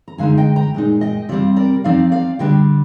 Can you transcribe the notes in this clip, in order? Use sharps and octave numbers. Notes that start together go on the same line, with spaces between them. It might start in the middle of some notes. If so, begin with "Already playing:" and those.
A#5
D3 G#3 D#4 F5 G#5
D#5 G5
G5 A#5
A#2 G#3 D#4
D#5 G5
C3 G3 C4 D5 F5
A#4 D5
F3 C4 D#4 D5 F5
D5 F5
D3 G3 D4 D#5 G5